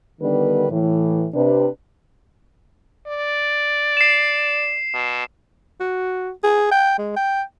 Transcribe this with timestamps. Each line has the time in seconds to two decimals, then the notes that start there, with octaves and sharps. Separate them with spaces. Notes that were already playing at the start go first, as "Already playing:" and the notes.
0.21 D3 D#3 G3 B3 D4 B4
0.70 A2 E3
1.33 C3 D4 B4
3.07 D5
3.97 C7 E7
4.94 B2
5.80 F#4
6.43 G#4
6.71 G5
6.98 G#3
7.16 G5